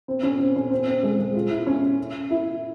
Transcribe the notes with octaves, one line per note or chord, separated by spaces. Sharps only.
C4
C#4
C4
C#4
C4
C4
G#3
G#3
F4
E4
C#4
E4